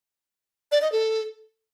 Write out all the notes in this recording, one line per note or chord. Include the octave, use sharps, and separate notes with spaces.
D5
D#5
A4